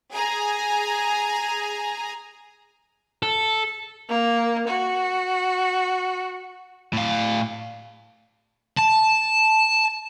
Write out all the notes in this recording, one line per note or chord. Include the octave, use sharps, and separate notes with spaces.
G#4 G#5 A#5
A4
A#3
F#4
A2 F5
A5